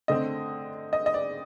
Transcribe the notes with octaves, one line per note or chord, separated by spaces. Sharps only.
D3 A3 C4 D#5
D#5
D#5
D5